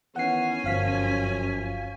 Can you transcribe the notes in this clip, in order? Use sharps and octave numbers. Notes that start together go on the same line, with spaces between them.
D#3 E3 B3 C#4 F#5 G#5 C7
G1 F#2 F3 F5 B6